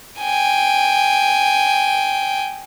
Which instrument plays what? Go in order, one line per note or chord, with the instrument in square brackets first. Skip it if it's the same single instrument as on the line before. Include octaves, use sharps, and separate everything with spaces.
[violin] G5 G#5